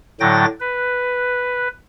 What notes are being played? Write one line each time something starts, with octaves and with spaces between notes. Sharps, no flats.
A2 D3 F#3 G5 A6 A#6
B4